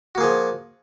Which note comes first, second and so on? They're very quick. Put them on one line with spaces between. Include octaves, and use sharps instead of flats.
F#4 A#3 G#4 F3